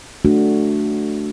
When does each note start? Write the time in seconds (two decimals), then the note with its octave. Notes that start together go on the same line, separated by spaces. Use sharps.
0.25 A3 D4 F#4